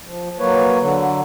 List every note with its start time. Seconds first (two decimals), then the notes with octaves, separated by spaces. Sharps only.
0.07 F3
0.39 F#3 A#3 B4 C#5
0.80 D3 F#3